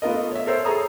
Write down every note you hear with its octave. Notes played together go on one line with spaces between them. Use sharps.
A3 B3 F4 A#4 D#5
C#5 E5
A4 A#4 C5 C#5 E6
G#4 A4 C#5 A#5 D#6